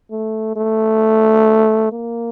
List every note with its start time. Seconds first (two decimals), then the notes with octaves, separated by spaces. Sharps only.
0.11 A3
0.56 A3
1.92 A#3